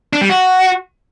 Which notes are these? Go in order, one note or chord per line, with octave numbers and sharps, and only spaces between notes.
D4
G3
F#4